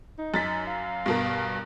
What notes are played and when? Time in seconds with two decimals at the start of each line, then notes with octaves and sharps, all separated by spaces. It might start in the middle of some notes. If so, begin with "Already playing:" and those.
0.18 D#4
0.34 F#2 A6 B6
0.67 F5
1.06 G2 B2 A#4